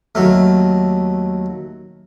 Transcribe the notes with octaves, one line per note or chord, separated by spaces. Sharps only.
D#2 F#3 A3